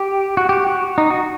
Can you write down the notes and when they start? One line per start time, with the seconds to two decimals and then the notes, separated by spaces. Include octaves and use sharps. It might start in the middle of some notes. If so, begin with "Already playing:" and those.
Already playing: G4
0.37 F#4
0.49 G4
0.67 F#4
0.98 D#4
1.11 F#4